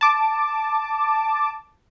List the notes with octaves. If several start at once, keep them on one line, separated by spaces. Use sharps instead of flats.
A5 D6